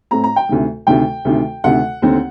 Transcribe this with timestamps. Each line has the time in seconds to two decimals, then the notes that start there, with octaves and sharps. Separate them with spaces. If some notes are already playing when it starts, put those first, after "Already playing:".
0.11 A2 A3 C4 A#5
0.24 A#5
0.36 G5
0.49 D2 C3 D#3
0.87 D2 C3 D#3 G5
1.25 D2 C3 D#3
1.64 D2 C3 D#3 F#5
2.02 D#2 D3 A3 C4